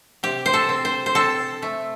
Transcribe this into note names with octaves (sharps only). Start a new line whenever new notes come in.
C3 G4
C5
A4
C4
C5
C5
C4 A4
A3